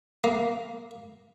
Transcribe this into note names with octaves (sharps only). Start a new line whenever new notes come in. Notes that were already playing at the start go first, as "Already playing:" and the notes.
A#3